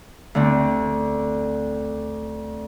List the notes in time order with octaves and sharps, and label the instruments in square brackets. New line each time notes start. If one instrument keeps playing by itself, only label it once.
[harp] D2 D3 C4 D4